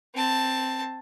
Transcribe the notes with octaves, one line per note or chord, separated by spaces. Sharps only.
C4 A5